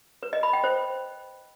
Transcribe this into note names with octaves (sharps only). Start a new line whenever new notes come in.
B4
D#5
B5
G5
C5